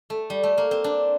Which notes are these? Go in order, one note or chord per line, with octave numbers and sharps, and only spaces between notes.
A3
G3
A3
A#3
C4
D4